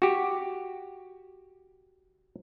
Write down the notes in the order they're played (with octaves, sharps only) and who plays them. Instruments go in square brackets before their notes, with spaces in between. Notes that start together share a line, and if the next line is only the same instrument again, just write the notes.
[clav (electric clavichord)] F#4 G4